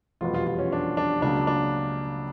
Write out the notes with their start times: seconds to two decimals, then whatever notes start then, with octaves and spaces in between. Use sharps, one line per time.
0.21 F1 E2 B2 G3 B3 F4
0.34 F4
0.47 F4
0.59 C#4
0.72 D4
0.97 D4
1.22 C#2 C#3 F#3 A#3 D4
1.47 D4